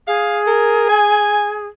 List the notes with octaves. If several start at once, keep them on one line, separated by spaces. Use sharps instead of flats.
G#4 F5
A#4
G#5